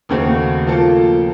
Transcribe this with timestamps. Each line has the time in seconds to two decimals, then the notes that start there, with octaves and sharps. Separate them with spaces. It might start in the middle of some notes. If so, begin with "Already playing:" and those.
0.09 D#2 C#3 A3 C4 F#4
0.67 F3 A#3 F4 A4